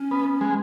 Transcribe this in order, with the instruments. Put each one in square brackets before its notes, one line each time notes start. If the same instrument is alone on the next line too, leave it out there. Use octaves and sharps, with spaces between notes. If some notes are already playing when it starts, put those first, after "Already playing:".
Already playing: [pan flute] C#4
[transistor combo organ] B3
G#3